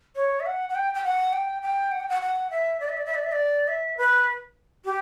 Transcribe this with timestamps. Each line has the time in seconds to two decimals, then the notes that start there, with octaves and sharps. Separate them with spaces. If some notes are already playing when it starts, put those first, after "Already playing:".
0.16 C#5
0.40 E5
0.46 F#5
0.69 F#5
0.75 G5
0.94 G5
1.04 F#5
1.33 G5
1.62 G5
1.92 F#5
2.00 G5
2.09 F#5
2.22 F#5
2.50 E5
2.80 D5
2.89 E5
2.97 D5
3.06 E5
3.15 D5
3.24 E5
3.32 D5
3.68 E5
3.97 B4
4.85 G4